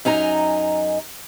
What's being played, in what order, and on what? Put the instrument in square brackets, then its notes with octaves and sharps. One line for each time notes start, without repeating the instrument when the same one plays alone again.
[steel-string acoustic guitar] F#2 D#4 G#5 A#5